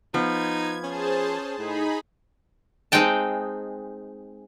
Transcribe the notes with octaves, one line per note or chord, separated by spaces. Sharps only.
F3 B3 D#4 G#6
C#4 G#4 C5 A5
A2 D#4 G#4 B5
G#3 C4 D#4 G5 A5